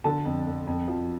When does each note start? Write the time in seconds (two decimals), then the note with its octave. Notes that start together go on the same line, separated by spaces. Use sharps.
0.04 D3 A5
0.25 F2
0.47 F2
0.67 F2
0.88 F3